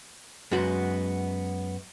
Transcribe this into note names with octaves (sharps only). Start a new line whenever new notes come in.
F#2 G#3 B3 F#4